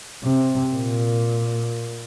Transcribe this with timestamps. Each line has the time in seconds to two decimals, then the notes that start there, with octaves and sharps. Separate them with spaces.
0.24 C3
0.73 A#2